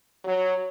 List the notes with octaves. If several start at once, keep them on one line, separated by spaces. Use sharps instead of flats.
F#3